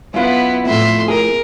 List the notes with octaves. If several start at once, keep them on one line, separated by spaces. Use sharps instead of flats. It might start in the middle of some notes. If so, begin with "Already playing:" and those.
F#2 B3 E4 F4
F2 A2 E5 C6
G#4 A#4